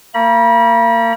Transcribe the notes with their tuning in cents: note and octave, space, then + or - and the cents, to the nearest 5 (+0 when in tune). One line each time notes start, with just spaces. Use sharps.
A#3 -35 B5 -40